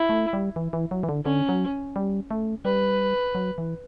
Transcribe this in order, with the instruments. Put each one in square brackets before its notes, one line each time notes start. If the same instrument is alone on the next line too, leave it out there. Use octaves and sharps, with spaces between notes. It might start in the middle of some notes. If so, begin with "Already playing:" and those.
Already playing: [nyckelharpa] E4
[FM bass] A3
G3
E3
E3
F#3
E3
D3
[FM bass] D3 [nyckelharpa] C#4
[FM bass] F#3
G3
A3
[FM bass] G3 [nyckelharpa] B4
[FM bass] F#3
E3